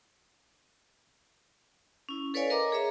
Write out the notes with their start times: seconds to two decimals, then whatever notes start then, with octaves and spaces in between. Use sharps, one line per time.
2.09 C#4 E4
2.34 A4 B4 C#5 D5 F5 G#5
2.50 A#4 D#5 A#5 D6
2.72 G#4 C#5 E5 A#5